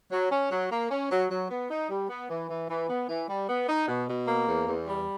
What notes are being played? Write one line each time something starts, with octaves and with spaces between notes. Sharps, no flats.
F#3
C#4
F#3
A#3
C#4
F#3
F#3
B3
D#4
G3
B3
E3
E3
E3
B3
E3
G3
B3
D#4
B2
B2
A#3
E2
E2
G3